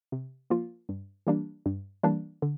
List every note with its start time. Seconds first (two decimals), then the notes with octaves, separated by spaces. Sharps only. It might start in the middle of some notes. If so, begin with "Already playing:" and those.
0.12 C3
0.50 F3 A#3 F4
0.89 G2
1.27 E3 G3 A#3 D4
1.66 G2
2.03 E3 G3 A#3 D4
2.42 D3